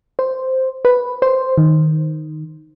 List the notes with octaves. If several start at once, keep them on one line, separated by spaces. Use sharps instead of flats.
C5
B4
C5
D#3